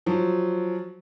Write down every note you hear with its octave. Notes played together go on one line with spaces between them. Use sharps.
F3 F#3